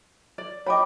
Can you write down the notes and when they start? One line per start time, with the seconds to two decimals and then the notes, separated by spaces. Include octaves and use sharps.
0.38 D5
0.66 C#5 D#5 G5 B5 D6